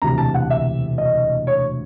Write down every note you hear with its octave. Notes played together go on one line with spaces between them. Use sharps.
E1 D2 C3 E3 A#5
A5
F#5
E5
D#5
C#5